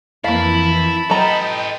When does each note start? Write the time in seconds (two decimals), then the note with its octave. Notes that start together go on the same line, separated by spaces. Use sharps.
0.24 F2 E3 A#3 E4 F5 A5 B5
1.10 F#3 A4 B4 D#5 G5 A#5